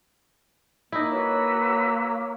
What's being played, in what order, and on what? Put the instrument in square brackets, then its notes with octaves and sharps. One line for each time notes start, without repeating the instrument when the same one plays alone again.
[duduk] A#3 [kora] D#4 E4
[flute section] F#4 B4 E6 [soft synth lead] C#5